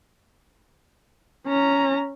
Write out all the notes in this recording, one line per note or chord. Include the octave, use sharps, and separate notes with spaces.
C#4 A#5